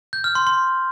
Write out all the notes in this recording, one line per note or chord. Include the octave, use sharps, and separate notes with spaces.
G6
F6
C6
C6